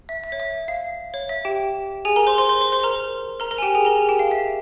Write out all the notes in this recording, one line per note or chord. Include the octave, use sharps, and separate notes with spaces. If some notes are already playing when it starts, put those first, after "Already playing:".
E5
E5
C#5
E5
F5
C#5
E5
G4 G5
G#4 G#5
A#4 A#5
C5 C6
C5 C6
C5 C6
C5 C6
C5 C6
A#4 A#5
A#4 A#5
A#4 A#5
G#5
G4 G5
G#4 G#5
A#4 A#5
G#4 G#5
G4 G5
F5
E5